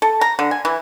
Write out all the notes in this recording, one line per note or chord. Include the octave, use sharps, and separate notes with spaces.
A4
A#5
D3
G#5
E3